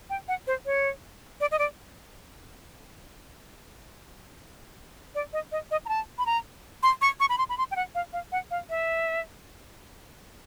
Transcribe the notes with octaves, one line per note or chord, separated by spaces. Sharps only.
G5
F#5
C5
C#5
D5
D#5
D5
D5
D#5
D#5
D#5
A#5
A5
B5
A#5
C6
C#6
C#6
B5
C6
B5
C6
G5
F#5
F5
F5
F#5
F5
E5